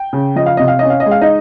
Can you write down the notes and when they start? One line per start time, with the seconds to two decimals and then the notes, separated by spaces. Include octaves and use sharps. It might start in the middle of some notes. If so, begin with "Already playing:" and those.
Already playing: G5
0.13 C#3
0.36 F3 D#5
0.46 F5
0.57 C3 D#5
0.68 F5
0.79 C#4 D#5
0.90 F5
1.00 D#5
1.06 G#3
1.11 F5
1.21 D#4 D#5